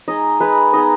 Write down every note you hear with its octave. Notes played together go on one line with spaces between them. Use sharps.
G#3 D#4 D#5
G#3 D#4 B4
G#3 B3 D#4 D#5